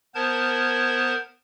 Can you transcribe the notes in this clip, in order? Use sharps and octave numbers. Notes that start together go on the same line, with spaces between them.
B3 A#4 C5 A5 G#6